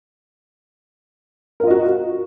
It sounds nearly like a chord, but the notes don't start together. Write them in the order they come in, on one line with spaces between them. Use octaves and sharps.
A#4 F4 D#5 F#4